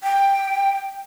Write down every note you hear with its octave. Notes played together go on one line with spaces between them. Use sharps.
G5